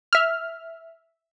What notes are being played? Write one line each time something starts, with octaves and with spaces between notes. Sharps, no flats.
E5 F6